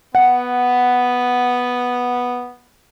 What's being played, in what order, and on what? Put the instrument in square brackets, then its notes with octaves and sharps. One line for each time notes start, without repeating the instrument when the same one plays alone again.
[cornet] B3 [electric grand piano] F#5